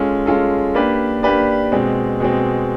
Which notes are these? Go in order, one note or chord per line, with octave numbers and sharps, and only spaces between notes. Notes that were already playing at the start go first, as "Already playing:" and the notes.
Already playing: G#3 C#4 F4 A4
G#3 C#4 F4 A4
A#3 D4 G4 B4 D5
A#3 D4 G4 B4 D5
B2 G#3 C4
B2 G#3 C4